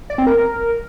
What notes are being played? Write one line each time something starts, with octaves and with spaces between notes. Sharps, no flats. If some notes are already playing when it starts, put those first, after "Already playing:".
D5
C4
A#4